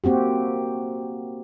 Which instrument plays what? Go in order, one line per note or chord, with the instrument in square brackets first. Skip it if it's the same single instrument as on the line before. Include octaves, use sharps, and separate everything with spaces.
[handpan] A#3 C4 F#4 G4